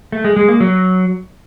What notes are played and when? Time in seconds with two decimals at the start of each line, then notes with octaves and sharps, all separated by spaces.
0.12 A3
0.24 G#3
0.36 G#3
0.48 A#3
0.60 F#3